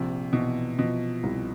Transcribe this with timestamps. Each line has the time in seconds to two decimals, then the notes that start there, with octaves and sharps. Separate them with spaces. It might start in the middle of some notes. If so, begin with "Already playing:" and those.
Already playing: A#1 C3
0.33 B2 E3
0.79 B2 F3
1.23 C2